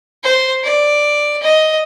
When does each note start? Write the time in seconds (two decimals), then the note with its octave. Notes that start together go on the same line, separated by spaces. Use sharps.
0.24 C5
0.64 D5
1.42 D#5